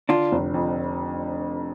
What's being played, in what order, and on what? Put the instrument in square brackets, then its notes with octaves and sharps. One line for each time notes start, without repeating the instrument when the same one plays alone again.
[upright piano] D3 [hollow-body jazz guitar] D4 F4
[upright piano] F1
F2